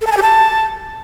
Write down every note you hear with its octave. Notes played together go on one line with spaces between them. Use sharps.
A4
A5
G#5
G4
A5